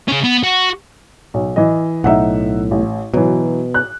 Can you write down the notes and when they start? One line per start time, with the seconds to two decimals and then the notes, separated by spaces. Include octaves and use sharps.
0.08 C#3 C#4
0.24 B3
0.44 F#4
1.34 B1
1.56 E3 D#5
2.04 B1 A2 D#4 E5 F#5
2.71 A1
3.14 B2 E3 F#3
3.74 F#6